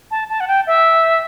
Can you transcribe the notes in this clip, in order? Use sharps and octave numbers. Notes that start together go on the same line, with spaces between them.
A5
A5
F#5
G5
E5